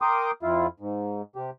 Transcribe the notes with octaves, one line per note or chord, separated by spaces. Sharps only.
A#4 G5 C6 D6 D#6
F2 E4 F4
G#2
C3 G4